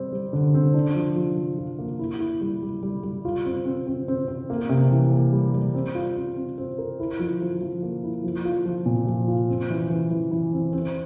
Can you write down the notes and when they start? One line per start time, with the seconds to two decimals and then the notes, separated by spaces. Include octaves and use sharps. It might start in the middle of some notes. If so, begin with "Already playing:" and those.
Already playing: G3 C4 G4
0.12 G3
0.33 D3
0.54 C4
0.74 D4
0.95 F3
1.16 F3
1.37 F3
1.58 F4
1.79 A#3
1.99 E4
2.20 E4
2.41 G3
2.63 G3
2.83 G3
3.04 G3
3.25 F4
3.45 C4
3.65 C4
3.87 C4
4.08 C4
4.28 C4
4.50 A#3
4.69 C3
4.91 E3
5.12 A#3
5.33 G3
5.54 G3
5.75 C4
5.95 F4
6.16 C4
6.36 C4
6.58 C4
6.78 A#4
7.00 E4
7.19 F3
7.41 F3
7.61 F3
7.83 A#3
8.04 E4
8.24 F3
8.45 F4
8.65 F3
8.86 A#2
9.07 F3
9.28 F4
9.49 C4
9.70 E3
9.90 E3
10.11 E3
10.32 E3
10.53 C4
10.73 C4